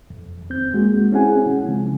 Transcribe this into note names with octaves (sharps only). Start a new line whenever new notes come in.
F2
D#2 C4 G6
G#3 A#3 F#4
C4 C#4 E4 G#4 F#5 G#5
C#3 F3 G#3